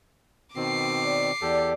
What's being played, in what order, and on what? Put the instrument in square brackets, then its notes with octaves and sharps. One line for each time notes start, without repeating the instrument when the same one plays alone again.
[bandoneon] B2 D#3 C4 [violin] D6 C7
[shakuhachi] D5
[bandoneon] E2 G4 A4 [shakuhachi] D5